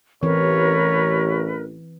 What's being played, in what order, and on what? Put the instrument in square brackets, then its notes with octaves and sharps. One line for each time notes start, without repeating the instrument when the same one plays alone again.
[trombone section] A1 [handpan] E3 C4 E4 [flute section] A#4 B4 [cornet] C#5